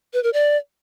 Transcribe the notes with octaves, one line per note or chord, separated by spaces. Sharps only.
B4
A#4
D5